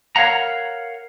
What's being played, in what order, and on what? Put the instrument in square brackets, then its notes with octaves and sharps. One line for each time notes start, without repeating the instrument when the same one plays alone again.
[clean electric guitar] A#4 C#5 F5 F#5 A#5